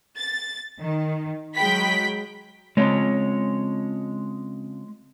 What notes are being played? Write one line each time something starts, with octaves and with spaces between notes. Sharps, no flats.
A6
D#3
F#3 G#3 G5 B5 B6
C#3 F3 G#3 C4 C#5